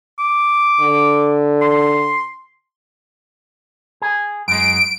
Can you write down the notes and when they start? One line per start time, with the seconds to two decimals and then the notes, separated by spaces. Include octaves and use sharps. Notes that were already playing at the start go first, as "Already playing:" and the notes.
0.19 D6
0.81 D3
1.62 C6
4.02 G#4
4.48 F#2 G#3 D7